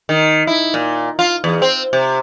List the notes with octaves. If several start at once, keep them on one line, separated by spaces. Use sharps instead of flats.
D#3
E4
A#2
F4
E2
C4
C3